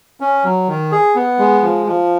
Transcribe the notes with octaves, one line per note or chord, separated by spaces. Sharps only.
C#4
F#3
D#3
G#4
B3
G#3
F3
F3